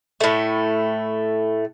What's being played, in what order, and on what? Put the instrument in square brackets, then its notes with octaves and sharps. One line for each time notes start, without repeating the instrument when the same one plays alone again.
[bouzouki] A2 A3